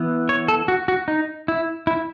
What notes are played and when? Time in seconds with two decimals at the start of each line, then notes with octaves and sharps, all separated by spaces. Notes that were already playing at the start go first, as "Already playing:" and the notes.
Already playing: E3 B3
0.29 C#5
0.48 A4
0.68 F#4
0.88 F#4
1.08 D#4
1.48 E4
1.87 E4